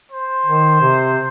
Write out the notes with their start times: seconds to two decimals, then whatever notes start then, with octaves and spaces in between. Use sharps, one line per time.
0.12 C5
0.46 D#3
0.81 C3